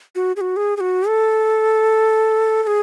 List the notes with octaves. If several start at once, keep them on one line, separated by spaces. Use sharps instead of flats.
F#4
G#4
F#4
G#4
G#4
F#4
A4
A4
G#4